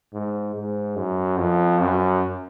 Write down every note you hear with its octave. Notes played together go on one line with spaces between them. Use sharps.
G#2
G#2
F#2
F2
F#2